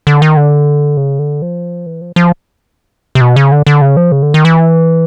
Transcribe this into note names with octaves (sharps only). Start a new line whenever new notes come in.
D3
D#3
D3
C#3
D3
F3
E3
F3
F3
C3
B2
C#3
D3
D3
C#3
F3
C#3
D3
D#3
E3